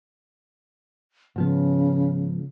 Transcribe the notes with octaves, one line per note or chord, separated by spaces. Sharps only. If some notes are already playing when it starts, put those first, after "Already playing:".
G#2 C#3 F3 B3